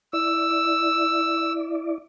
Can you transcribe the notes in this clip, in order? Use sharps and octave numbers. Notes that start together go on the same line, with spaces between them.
E4 D5 E6